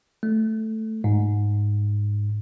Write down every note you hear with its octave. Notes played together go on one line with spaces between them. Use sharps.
A3
G#2